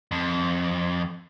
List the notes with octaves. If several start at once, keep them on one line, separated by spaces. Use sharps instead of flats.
F2